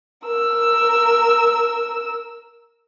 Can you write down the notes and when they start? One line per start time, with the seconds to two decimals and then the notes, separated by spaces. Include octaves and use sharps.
0.25 A#4 E6